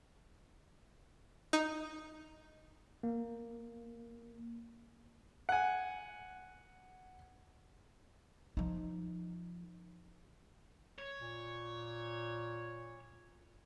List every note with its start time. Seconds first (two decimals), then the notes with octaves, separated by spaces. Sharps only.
1.53 D#4
3.03 A#3
5.49 F#5 G#5
8.57 F3 D#4
10.99 C#5
11.20 A#2